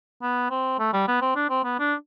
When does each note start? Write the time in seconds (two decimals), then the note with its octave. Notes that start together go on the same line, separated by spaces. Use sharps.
0.22 B3
0.51 C4
0.79 A3
0.93 G3
1.08 B3
1.22 C4
1.36 D4
1.50 C4
1.64 B3
1.79 D4